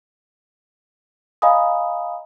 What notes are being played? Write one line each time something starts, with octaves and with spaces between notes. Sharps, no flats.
D#5 F5 G#5 A#5 B5 D#6